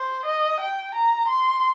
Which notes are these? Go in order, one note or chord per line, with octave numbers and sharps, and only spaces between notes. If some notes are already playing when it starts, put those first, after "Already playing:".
Already playing: C5
D#5
G5
A#5
C6